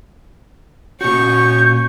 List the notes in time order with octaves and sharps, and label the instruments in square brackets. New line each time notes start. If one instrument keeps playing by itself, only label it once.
[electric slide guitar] A#2 F#4 [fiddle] C#4 C#6 [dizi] G6